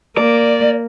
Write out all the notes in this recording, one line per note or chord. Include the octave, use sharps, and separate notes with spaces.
A#3 D5